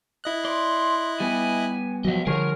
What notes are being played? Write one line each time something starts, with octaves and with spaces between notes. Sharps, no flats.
E4 D#5 F#6
D5 C6
G3 B3 G4 G#5
F3 F#3 D#5 F5
D3 F3 G3 G#4 A#4 C#5